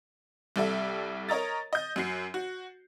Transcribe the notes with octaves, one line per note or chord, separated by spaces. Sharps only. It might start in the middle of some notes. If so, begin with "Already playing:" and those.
C2 G3 A4 E5
A#4 C#5 D#5 A#5 A6
D#5 G6
F#2 F#4 C7
F#4